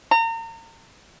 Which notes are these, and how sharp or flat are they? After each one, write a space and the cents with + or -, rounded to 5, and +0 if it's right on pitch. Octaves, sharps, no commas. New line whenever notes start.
A#5 -35